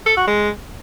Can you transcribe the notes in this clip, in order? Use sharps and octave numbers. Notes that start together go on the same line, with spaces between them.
A4
F#4
G#3